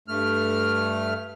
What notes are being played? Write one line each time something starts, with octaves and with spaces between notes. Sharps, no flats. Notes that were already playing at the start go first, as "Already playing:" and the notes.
G2 A3 F6